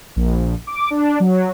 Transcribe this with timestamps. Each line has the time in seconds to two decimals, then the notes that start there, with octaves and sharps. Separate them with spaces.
0.16 A#1
0.67 D6
0.91 D4
1.20 F#3